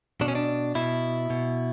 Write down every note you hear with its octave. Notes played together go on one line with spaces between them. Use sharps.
B2 D4
C#4
D4
B2 E4
B2